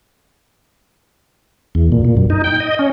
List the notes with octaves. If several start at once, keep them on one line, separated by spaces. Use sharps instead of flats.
E2
A#2
A#2
F#2
D#4
G5
D#5
C#4